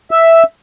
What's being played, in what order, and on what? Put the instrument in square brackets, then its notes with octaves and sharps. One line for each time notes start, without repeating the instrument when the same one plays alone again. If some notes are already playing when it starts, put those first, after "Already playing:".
[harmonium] E5